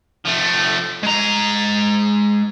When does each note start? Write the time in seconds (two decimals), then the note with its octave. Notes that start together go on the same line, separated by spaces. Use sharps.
0.25 F3 A3
1.03 G#3 A#5